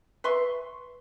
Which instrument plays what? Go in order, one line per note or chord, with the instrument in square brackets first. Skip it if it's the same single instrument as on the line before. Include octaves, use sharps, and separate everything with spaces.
[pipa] B4 E5 C6 C#6